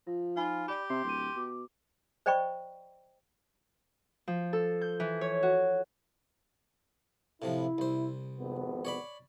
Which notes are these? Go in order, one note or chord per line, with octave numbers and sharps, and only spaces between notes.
F3 F4
D#4 F4 G#5 B5
G4 D5 B5
C3 C6 C7
D1 C6 D#7
B2 D6
C5 D5 D#5 G5 B5 C#6
F3
A4
G6
E3
C#5
F#4
A2 C3 F3 E4
C2 C5
G#1 F2 B3
C#5 D5 B5